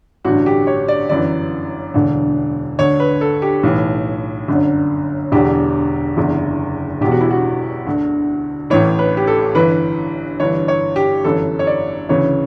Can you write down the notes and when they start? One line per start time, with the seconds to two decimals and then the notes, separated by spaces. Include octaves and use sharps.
0.24 A1 G2 D3 F#4
0.46 G4
0.67 C#5
0.88 D5
1.09 G1 F#2 E3 D5
1.94 E1 D2 D3
2.79 D2 D3 C#5
3.00 B4
3.21 A4
3.42 G4
3.63 B1 A2 E3
4.48 G1 F#2 D3
5.32 E1 E2 D3 G4
6.17 F#1 E2 D3
7.01 E1 E2 B2 G4
7.11 F#4
7.21 E4
7.30 F#4
7.87 D2 D3
8.70 A1 A2 E3 C#5
8.99 B4
9.17 G4
9.27 A4
9.55 G1 G2 E3 B4
10.40 G1 G2 E3 C#5
10.68 C#5
10.96 G4
11.24 G1 F#2 E3 A4
11.59 C#5
11.67 D5
12.09 D2 C#3 E3 C#5